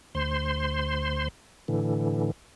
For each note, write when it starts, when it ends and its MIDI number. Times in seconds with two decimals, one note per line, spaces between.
0.15 1.28 38
0.15 1.28 72
0.15 1.28 84
1.68 2.31 45
1.68 2.31 50
1.68 2.31 52